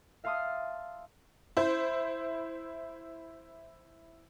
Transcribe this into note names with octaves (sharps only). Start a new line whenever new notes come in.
E5 F5 A5 C6 D#6
E4 C5